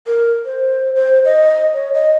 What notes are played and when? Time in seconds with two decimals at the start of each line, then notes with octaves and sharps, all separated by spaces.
0.07 A#4
0.45 C5
0.95 C5
1.25 D#5
1.74 C#5
1.94 D#5